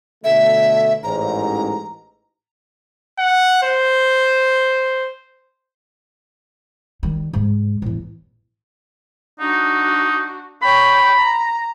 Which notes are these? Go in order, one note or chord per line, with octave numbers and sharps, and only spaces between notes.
B2 D3 A3 E5
A1 G#2 A#5
F#5
C5
D#3 G3
G#2 C3
A1 E2
D4 D#4 F#4
C#5 G5 B5
A#5